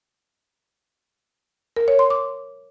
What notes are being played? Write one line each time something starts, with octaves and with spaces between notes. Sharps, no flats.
A#4
C#5
C6
D6